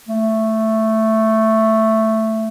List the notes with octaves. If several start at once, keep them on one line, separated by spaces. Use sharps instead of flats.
A3